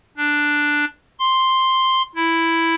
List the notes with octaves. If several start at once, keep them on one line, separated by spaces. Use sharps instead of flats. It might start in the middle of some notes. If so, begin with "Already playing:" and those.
D4
C6
E4